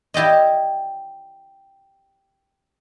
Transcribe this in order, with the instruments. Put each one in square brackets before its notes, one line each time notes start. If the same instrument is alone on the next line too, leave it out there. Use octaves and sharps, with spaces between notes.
[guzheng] E4 G4 D5 D#5